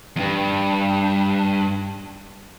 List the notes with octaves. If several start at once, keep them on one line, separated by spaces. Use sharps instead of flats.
E2 G2